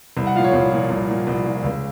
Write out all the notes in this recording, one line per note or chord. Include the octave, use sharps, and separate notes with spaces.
C2
F#5
A#2 F3 F5
C#5
C2
A#2 F3
C2
A#2 F3
C2
A#2 F3
C#2